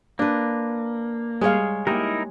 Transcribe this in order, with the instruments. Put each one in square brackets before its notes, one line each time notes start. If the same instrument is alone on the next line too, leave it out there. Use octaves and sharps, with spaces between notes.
[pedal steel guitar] A#3 [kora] D4 B4
[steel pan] G3 G#4 F5 [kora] G#3 C#5
[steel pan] A#3 G4 [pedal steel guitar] D#4 E4 A#4